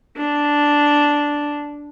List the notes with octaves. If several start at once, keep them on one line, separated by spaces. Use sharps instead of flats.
D4